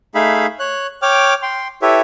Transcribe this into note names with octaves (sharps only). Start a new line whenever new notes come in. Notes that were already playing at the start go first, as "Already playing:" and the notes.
A3 D#4 G#4 E5 F5 B5
C#5 F#6
C#5 G5 D6 F6
G5 C6
E4 G4 A4 B4 C#5 E5